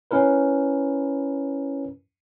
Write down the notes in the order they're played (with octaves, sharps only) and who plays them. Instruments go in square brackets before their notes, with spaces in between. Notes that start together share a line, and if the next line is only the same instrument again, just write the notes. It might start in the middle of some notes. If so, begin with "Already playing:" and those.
[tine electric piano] C#4 E4 A#4 B4